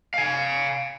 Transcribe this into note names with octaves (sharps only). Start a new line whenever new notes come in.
F5 G#5